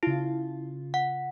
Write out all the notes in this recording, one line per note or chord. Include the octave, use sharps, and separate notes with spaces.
C#3 E4 F4
F#5